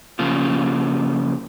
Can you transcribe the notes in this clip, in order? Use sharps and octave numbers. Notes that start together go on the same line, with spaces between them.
C#3 F3 A#3 F4